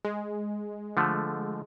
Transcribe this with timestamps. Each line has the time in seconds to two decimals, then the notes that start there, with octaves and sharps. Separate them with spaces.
0.05 G#3
0.97 D3 F3 A3